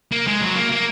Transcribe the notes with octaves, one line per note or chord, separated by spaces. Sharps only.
A#3
G#3
F#3
A#3
A#3